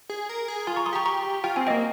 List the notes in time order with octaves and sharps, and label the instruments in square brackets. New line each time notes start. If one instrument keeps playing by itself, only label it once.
[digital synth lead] G#4
A#4
G#4
[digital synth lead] F4 [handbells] G#5 C6
[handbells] A#5 C#6
C6 D#6
[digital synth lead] G4 [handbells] A#5 C#6
[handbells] A#5 C#6
[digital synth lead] F4 [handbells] G5
[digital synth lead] C4 [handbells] G#5
[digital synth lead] A#3 [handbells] D#5 G5